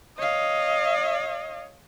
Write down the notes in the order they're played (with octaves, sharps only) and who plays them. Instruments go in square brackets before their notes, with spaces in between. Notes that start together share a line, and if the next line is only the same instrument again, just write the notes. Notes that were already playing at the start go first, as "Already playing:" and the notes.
[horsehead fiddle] C#5 F5 [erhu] D#5